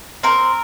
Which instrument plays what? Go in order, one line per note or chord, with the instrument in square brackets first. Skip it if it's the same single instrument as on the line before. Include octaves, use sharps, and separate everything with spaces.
[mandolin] C4 A#4